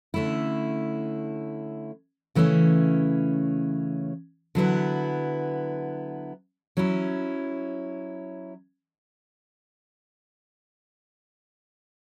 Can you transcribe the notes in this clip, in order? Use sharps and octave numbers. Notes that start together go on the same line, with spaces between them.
D3 A3 C#4 E4
C#3 E3 A3 C#4
D3 F#3 B3 E4
F#3 C#4 E4